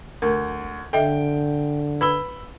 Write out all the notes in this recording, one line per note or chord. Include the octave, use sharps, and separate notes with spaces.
D2 A#4
D3 A4 D#5 E5 G5
B4 B5 E6 G7